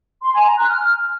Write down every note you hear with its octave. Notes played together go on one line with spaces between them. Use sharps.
C6
G#5
A#5
F#6
F6